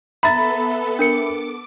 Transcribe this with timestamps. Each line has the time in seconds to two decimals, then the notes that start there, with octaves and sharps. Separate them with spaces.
0.23 B3 A4 E5 A#5 B5 A6
0.99 D4 A#4 D6 C#7